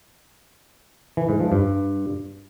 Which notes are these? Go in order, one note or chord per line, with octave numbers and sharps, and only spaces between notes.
E3
G#2
F3
G2